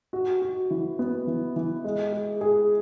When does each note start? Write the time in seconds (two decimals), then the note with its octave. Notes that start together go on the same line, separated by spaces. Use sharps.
0.13 F#4
0.42 F#4
0.71 E3
0.99 B3
1.27 E3
1.56 E3
1.84 G#3
2.13 G#4
2.41 G#4